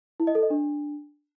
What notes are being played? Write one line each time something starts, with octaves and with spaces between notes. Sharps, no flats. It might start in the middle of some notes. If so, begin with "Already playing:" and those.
E4
D#5
A4
D#5
D4